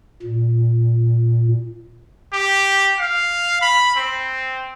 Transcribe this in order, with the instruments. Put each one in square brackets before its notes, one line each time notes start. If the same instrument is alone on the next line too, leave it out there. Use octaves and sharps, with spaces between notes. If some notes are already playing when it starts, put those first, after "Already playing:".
[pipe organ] A#2
[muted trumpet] G4
F5
B5
C4